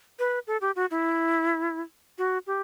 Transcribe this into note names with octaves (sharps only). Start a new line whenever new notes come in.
B4
A4
G4
F#4
E4
F#4
G4